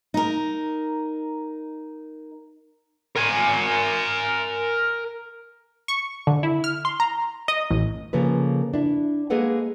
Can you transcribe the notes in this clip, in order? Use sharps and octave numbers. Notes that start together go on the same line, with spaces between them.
D#4 A#4
A#4 G#5
C#6
D3
E4
F6
C6
A#5
D#5
A1
C#3 F3 A#3 A4 B4
D4 E4
G#3 A#3 G#4 A4 B4 F#5